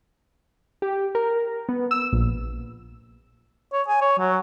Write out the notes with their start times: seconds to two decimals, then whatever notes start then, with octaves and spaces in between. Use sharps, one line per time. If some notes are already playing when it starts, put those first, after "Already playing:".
0.82 G4
1.15 A#4
1.69 B3
1.91 E6
2.13 A#1
3.73 C#5
3.88 G#5
4.01 C#5
4.18 F#3